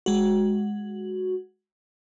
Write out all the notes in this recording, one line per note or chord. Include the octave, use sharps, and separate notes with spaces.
G#3 F#4